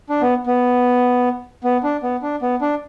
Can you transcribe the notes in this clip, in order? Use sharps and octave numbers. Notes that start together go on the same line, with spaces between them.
D4
B3
B3
B3
D4
B3
D4
B3
D4